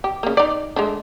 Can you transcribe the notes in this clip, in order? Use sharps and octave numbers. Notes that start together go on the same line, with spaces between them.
G4
C#3 A#3
D#4 D5
G#3 A3 D4